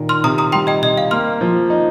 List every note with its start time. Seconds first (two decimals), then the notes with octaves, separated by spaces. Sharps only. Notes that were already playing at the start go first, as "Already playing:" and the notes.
Already playing: A#2 D#3
0.09 C6 F6
0.24 C3 A#5 D#6
0.38 A#5 D#6
0.52 G3 G5 C6
0.67 D#5 G5
0.82 C3 D#5
0.97 F5
1.11 A#3 C6 F6
1.41 F3
1.70 D#4